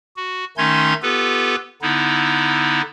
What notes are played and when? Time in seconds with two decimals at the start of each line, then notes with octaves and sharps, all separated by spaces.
0.17 F#4
0.57 D#3 A3 C#4 D#4 C6 G#6
1.03 B3 F4 G4 A4 B4
1.82 D3 B3 D#4 E4